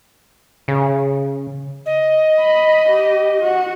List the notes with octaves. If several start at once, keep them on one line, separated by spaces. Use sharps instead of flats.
C#3
D#5
B5
G4
F#4